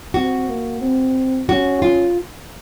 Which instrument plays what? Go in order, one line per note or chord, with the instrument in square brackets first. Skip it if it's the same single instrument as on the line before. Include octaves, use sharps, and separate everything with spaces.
[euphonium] C4 [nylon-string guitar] F#4
[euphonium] A#3
C4
[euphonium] C#4 [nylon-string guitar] F#4
[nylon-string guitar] F4